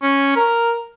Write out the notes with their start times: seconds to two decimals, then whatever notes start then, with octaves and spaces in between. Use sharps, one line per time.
0.02 C#4
0.36 A#4